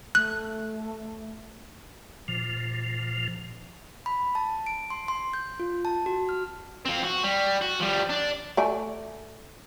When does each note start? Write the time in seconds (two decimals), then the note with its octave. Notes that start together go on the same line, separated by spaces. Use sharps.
0.15 A3 F#6
2.28 A#2 F3
4.06 B5
4.35 A5
4.67 D7
4.90 C6
5.08 C6
5.33 G6
5.60 F4
5.85 A5
6.06 F#4
6.29 F6
6.85 F3 C4
7.03 F#4
7.24 G3
7.62 F#4
7.80 F3 G3
8.09 D4 D5
8.57 A3 D5 G#5